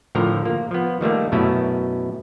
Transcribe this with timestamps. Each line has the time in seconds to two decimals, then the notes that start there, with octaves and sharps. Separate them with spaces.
0.15 A2 D3 F3 A#4 A#5
0.45 A#3
0.71 F3 B3
1.01 D#3 G3 A3 A#3
1.32 F#2 B2 A3 C#4 E4